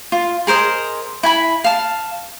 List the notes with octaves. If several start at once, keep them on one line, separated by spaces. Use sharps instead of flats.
F4
G#4 A#4 C5 D#5
E4 G#5 B5
F5 A5